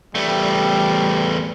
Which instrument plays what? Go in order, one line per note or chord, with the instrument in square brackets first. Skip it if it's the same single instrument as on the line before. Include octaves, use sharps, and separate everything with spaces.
[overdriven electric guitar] E2 A3 [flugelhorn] G3